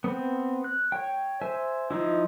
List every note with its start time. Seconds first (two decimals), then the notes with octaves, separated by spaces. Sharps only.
0.04 B3 C4
0.64 F#6
0.92 C#5 G5
1.42 C5 E5 G#5
1.91 F3 D#4 E4